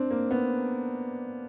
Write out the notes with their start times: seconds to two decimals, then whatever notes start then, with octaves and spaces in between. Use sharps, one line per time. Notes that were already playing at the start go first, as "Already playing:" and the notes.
Already playing: C4 D4
0.11 A#3
0.31 B3